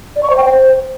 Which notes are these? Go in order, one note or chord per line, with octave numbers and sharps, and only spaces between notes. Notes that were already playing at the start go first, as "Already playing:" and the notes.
D5
C#6
C5
G5
C5